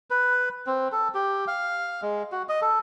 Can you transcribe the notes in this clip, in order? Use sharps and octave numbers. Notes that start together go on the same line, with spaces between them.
B4
C4
A4
G4
F5
G#3
F#4
D#5
A4